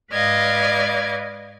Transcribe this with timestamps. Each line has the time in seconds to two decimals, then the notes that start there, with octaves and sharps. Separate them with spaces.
0.13 G#2 B4 D5 D#5 F5 G#6